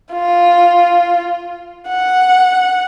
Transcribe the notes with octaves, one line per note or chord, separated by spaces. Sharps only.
F4
F#5